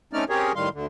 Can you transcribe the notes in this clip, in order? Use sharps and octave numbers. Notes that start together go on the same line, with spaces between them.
A3 C4 C#4 D#4 D5 F6
C4 C#4 G4 G#4 A#4 C#5
A2 D#3 G3 F5 C6
D2 D3